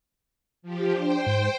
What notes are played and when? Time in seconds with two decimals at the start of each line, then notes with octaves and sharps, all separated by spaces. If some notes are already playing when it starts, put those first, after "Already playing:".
0.62 F3 G4
0.94 D4 C5 G5
1.27 G#2